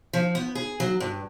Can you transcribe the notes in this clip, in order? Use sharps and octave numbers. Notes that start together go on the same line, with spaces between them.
F3
B3
G#4
F#3
G2